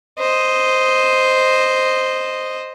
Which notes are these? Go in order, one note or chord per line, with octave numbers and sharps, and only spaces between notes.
C5 D#5